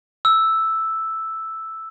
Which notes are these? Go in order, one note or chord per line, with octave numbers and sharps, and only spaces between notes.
E6